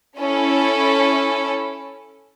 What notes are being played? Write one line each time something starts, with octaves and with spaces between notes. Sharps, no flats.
C#4 E4 A4